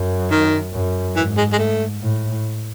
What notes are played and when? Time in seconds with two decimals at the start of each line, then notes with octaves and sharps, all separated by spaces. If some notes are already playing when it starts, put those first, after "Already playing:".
Already playing: F#2
0.31 D#3
0.73 F#2
1.16 G#2 E3
1.37 G#3
1.53 G#3
1.59 A3
2.02 A2